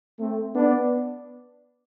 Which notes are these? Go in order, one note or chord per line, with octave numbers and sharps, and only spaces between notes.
A3 C4
B3 D4